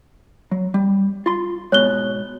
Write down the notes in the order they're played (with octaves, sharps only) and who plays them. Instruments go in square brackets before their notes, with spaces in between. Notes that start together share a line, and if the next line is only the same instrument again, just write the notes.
[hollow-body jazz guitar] F#3
G3
F4 C6
[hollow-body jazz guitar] G#2 B2 [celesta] C#5 F#6 G7